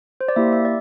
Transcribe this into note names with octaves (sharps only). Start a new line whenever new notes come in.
C5
D5
A#3 E4 G4 E5
E5
D5